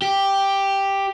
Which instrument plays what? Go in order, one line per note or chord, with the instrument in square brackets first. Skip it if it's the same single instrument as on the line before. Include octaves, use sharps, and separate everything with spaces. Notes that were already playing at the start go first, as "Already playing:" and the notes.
[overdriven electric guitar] G4